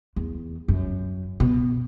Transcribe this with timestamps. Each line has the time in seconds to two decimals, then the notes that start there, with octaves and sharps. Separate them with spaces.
0.16 E2
0.68 F#2
1.40 B2